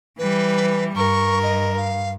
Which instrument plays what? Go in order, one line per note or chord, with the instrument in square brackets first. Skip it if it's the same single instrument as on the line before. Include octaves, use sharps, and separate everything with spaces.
[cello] E3 G3 [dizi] B4
[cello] G2 [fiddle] A#4 [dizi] C#6
[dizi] D#5
F5